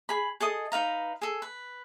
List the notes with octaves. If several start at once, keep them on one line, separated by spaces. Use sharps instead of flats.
G#4 B5
G#4 A4 D#5 D#6
D#4 B4 F5 A#5
G#4 A4
B4